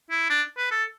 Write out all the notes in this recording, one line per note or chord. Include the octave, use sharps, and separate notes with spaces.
E4
D4
B4
A4